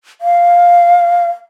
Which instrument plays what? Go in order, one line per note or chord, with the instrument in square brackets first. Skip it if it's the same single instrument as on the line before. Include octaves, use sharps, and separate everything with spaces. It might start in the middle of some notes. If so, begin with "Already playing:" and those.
[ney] F5